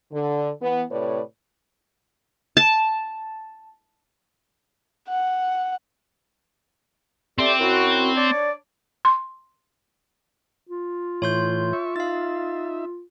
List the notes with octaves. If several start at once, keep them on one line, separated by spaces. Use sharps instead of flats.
D3
E3 B3
A2 C3 B4 C#5 D5
A5
F#5
A3 C4 G4 D5
F#2 E4 F#4
D4 C#5 D5
C6
F4
A2 E3 C#5 C6 G6
E5 C#6
D#4 E5 F5 A6